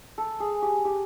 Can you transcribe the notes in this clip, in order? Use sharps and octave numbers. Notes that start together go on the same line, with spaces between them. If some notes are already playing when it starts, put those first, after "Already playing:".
A4
G#4
G4
G4